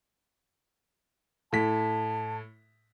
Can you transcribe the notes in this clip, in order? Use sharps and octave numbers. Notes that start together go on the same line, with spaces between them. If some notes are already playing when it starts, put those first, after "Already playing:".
A2 A5 B6